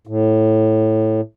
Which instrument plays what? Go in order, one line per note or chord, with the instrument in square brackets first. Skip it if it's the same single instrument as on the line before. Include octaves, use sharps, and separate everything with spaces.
[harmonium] A2